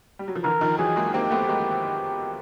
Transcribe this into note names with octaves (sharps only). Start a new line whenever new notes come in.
G3
F#3
F3
D3 E3 A#4
D#3 F3
E3 F#3 G#4
G#3 A#3
A#3 C4 G4
A3 B3
G#3 A#3